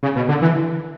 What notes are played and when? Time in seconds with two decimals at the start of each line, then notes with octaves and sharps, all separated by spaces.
0.03 C#3
0.16 B2
0.29 D3
0.42 E3